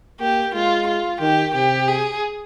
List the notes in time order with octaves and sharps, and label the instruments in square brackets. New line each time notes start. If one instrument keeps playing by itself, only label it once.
[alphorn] A#3 [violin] G4
[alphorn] G#3 [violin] F4
[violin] F4
[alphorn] D#3 [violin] G4
[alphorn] C3 [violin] G4
[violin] G#4